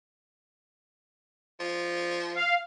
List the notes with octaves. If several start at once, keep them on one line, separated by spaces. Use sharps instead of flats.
F3
F5